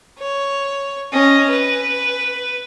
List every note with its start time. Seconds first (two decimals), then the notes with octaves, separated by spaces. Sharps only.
0.19 C#5
1.12 C#4 D#5
1.50 B4